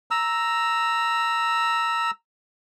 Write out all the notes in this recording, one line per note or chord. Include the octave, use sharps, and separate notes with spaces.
A#5 E6